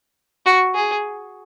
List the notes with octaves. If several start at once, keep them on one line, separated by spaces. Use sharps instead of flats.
F#4
G#4